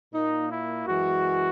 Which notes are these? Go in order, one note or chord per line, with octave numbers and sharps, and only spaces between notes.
A#2 A#3 D#4
E4
F#2 E3 G#3 F#4